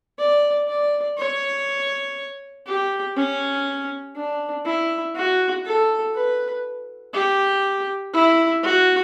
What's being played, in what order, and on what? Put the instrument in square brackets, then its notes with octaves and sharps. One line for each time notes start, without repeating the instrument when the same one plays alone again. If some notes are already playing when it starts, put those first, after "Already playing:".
[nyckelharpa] D5
D5
C#5
G4
C#4
D4
E4
F#4
A4
B4
G4
E4
F#4